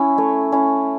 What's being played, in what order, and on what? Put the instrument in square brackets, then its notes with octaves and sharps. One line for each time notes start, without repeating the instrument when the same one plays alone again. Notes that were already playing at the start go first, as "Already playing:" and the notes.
Already playing: [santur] C#4 E4
A3 C#5
C#4 E4